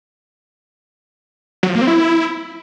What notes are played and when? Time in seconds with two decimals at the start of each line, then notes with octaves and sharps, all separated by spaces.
1.63 F#3
1.69 F3
1.75 A#3
1.81 C4
1.87 E4